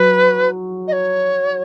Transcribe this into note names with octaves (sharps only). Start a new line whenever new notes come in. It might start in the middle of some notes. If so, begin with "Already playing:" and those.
Already playing: F#3 B4
D#5
C#5